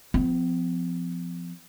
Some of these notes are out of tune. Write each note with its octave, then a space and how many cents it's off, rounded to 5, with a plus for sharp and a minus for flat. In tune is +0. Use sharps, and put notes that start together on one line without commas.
F3 +0 C4 -45